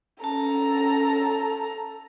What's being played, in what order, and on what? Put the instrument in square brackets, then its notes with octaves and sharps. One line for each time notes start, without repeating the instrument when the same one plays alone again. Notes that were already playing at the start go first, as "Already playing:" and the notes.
[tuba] C#4 [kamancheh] A4 A#5 [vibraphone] A5